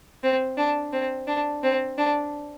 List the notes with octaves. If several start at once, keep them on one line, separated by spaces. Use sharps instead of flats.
C4
D4
C4
D4
C4
D4